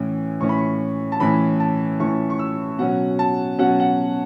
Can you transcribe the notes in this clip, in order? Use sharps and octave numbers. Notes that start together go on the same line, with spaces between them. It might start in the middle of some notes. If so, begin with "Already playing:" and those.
Already playing: A2 E3 C#4
A2 E3 C#4 C#6
B5
C#6
A5
A2 E3 C#4 B5
A5
A2 E3 C#4 C#6
C#6
E6
B2 F#3 C#4 F#5
A5
B2 F#3 C#4 F#5
F#5